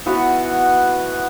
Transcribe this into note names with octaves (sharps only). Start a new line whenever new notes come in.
E3 B3 F#4